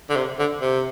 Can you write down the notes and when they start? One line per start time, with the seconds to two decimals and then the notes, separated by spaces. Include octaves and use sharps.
0.10 D3
0.16 C3
0.39 D3
0.61 C3